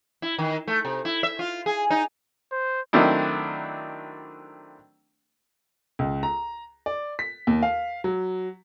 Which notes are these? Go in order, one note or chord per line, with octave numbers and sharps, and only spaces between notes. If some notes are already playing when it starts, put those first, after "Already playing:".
E4
D#3
A3
C3
E4
E5
F4
G#4
D#4
C5
D#3 F#3 A3 C4 D4 E4
C#2
A#5
D5
B6
D#2
F5
F#3